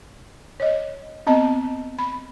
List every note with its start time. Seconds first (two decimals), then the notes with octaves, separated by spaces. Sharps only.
0.60 C#5 D#5
1.27 B3 C4 D#5 A5
1.99 B5